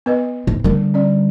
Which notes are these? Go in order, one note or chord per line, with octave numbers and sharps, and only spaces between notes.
B3 B4 D#5
G#2
D3 G3 A#4
C#4 D5